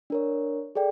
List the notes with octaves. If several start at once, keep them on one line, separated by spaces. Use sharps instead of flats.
D4 A#4 C#5
G#4 A4 D5 G5